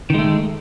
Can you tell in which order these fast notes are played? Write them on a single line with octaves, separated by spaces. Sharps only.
D#3 G#3 A3